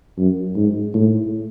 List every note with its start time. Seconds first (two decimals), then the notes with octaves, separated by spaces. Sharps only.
0.18 F#2
0.56 G#2
0.94 A2